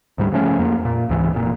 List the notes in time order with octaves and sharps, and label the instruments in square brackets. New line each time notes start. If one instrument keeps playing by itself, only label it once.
[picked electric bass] D2 G#2 G3
C#3 F3 A3 C#4
F2 A#3
A#2
C#2 G#2 E3
F1 A#2